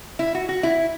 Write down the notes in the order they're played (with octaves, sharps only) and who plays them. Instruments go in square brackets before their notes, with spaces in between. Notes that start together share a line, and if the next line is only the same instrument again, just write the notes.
[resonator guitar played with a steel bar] E4
F#4
F#4
E4